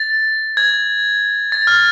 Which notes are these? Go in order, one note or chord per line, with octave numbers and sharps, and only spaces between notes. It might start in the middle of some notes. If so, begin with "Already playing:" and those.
Already playing: A6
G#6
A6
F6